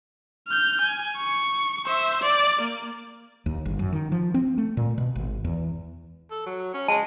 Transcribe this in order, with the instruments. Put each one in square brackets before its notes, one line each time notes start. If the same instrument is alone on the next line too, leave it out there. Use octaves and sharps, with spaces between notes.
[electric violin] F6 G6
G#5
C#6
C5 E5
D5
A#3
[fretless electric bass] D#2
G1
F#2
D#3
F3
C4
A3
A#2
B2
G#1
E2
[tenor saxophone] A4
F#3
C#4
[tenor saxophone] G#3 [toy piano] A5